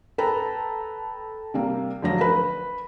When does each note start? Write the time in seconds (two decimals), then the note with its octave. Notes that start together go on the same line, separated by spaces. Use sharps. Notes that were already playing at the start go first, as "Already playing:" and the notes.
0.18 A4 B4 G5 A5 A#5
1.54 C3 G3 A#3
2.02 F1 D3 F3 F#3 A#6
2.21 B4